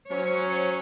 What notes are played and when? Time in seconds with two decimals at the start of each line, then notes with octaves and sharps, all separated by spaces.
0.11 F#3 C#4 C5 C#5